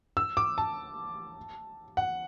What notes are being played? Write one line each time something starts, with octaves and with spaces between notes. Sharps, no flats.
E6
D6
A5
F#5